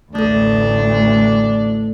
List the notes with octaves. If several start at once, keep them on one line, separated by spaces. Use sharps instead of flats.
A1 D2 A3 D4 A4